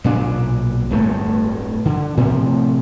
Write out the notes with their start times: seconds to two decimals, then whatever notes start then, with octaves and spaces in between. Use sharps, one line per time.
0.04 B1 A#2 D4
0.90 D1 G1 G2 A3
1.85 D3
2.17 A2 C3 F3